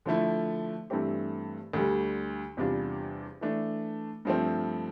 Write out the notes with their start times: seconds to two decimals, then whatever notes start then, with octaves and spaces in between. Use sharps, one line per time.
0.06 D3 F3 A3 E4
0.90 G2 E3 A3 C4 G4
1.73 D2 D3 G3
2.57 E2 C3 G3 D4 F4
3.41 E3 A3 D4
4.25 G2 F3 A3 C4